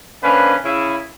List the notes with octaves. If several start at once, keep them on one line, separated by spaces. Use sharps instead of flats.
D3 A#3 C4 C#4 B4
C#3 E4